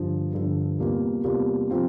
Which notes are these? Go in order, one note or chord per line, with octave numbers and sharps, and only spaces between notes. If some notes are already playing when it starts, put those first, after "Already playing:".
Already playing: G2 D3 F3
G2 D3 F3
E2 C3 G3 A#3 F4
E2 C3 G3 A#3 F4
C3 F3 C4 F4